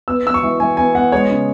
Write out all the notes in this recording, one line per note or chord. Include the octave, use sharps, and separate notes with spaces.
B3 E6
B3 E6
C#6
E3
E3 G#5
B3 G#5
B3 F#5
G#3 C#5
C#3